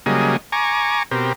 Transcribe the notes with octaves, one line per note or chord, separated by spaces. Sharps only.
C#3 F#3 G3 A#3 G#4 D#5
G#5 A#5 C#6 D6
B2 C4 G4 A#4